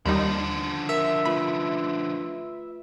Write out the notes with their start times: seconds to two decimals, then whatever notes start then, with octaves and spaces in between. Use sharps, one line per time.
0.06 D#2 D3 F3 G3 D#4
0.89 A#4 E5
1.26 A3 F4 B4 B5